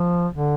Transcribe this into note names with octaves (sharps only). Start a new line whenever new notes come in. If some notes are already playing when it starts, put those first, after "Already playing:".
Already playing: F3
D3